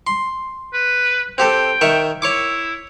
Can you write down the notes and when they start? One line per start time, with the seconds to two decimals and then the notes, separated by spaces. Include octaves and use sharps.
0.07 C6
0.73 B4
1.38 C4 G4 A4 G5
1.81 D#3 E5 C#6
2.22 E4 C#5 C#6 D6